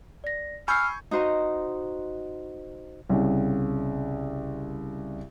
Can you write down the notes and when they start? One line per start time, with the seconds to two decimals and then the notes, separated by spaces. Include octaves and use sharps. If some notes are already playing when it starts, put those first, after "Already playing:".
0.24 D5 A#6
0.68 G#5 B5 C#6 E6 F6 G6 C7
1.11 D#4 F#4 C5 D#5 A#5
3.09 C2 C#3